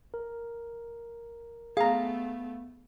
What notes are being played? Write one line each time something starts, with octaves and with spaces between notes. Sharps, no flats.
A#4
A3 B3 G#4 F5 A#5